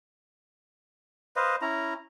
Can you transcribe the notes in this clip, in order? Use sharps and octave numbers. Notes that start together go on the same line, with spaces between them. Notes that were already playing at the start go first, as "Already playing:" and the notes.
B4 C5 D#5 F5
C#4 E4 A#5